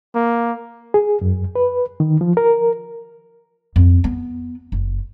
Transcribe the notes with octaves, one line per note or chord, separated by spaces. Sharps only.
A#3
G#4
F#2
B4
D#3
F3
A#4
F2
B3
F#1